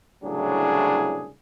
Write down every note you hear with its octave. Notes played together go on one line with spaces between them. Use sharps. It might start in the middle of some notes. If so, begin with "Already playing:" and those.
C2 A2 C#3 F#3 D4 G#4